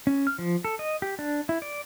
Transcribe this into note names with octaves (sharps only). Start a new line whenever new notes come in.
C#4
F6
F3
A4
D#5
G4
D4
E4
D5